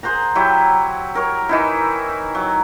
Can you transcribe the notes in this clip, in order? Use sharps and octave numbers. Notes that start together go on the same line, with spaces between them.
G#4 C5 F#5 A#5
F#3 E4 G4
A#4 C#5
E3 D#4 E4
F#3